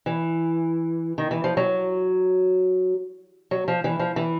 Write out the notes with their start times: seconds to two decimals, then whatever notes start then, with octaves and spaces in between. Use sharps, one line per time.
0.06 E3
1.18 D#3
1.31 E3
1.44 F3
1.57 F#3
3.51 F#3
3.68 F3
3.84 E3
3.99 F3
4.16 E3